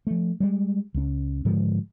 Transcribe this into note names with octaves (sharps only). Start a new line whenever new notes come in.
F3 A3
G3 G#3
C#2 C#4
G#2 D3 F3 G#3